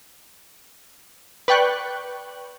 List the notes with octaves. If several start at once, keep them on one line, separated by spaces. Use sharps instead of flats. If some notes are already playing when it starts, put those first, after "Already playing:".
B4 D5 G5 C#6 F#6